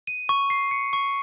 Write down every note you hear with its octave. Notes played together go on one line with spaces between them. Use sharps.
D#7
C#6
C7
C#7
C#6